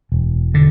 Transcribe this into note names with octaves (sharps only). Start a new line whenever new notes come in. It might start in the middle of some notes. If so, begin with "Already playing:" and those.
E1
D3